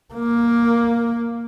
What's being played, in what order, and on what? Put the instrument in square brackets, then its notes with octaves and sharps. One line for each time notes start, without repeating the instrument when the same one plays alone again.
[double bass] A#3